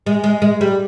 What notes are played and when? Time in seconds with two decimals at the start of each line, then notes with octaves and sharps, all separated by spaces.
0.06 G#3
0.24 G#3
0.42 G#3
0.61 G3